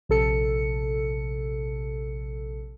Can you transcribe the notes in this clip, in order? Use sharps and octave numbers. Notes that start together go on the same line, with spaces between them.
A#1 C3 A4 C#7